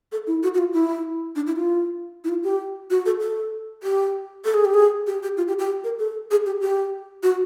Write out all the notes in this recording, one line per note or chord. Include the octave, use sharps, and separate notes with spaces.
A4
E4
F#4
F#4
F4
E4
D4
E4
F4
E4
F4
G4
F#4
A4
A4
G4
A4
G#4
G4
G#4
G4
G4
F4
G4
G4
A#4
A4
G#4
G4
G4
F#4